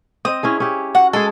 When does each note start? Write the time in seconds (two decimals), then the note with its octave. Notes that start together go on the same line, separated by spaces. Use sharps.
0.25 C4 D#5 D#6
0.43 C#4 E4 G#4
0.60 C#4 G4
0.95 F#4 F#5
1.13 G#3 G#4 A4